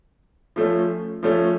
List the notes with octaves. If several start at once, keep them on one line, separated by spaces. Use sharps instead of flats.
F3 A3 C#4
F3 A3 C#4